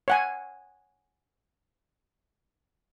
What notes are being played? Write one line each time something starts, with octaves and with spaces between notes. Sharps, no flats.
C#5 F#5 G#5